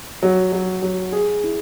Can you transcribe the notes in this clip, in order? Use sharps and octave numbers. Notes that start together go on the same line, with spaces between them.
F#3
F#3
F#3
G#4
E4